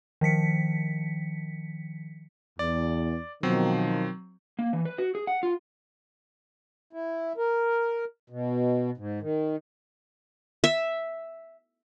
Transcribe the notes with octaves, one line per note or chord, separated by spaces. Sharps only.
D#3 F3 B6 C#7
E2 D5
B2 D#3 F3 F#3 C4
A#3
E3
B4
F#4
G#4
F#5
F4
E4
A#4
B2
G#2
D#3
E5